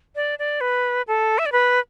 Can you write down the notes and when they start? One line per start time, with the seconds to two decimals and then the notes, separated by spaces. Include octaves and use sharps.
0.15 D5
0.39 D5
0.61 B4
1.07 A4
1.38 E5
1.46 D5
1.52 B4